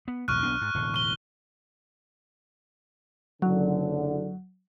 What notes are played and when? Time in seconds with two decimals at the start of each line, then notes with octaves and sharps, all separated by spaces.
0.08 B3
0.28 B1 E2 A2 C#6 F6 F#6
0.43 B1 B3 D4
0.61 G#2
0.74 E1 A2 D3
0.94 C#6 G7
3.42 F#1 D3 F#3